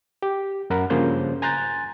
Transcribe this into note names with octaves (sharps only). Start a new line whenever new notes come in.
G4
F#2 A#4 F#5 B5
G2 C#3 F3 A#3 C5 G6
G#5 A#5 C6 F#6 G6 A6